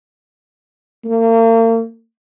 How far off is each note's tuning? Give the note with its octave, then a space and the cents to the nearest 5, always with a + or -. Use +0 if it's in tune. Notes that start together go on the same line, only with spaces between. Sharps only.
A#3 -40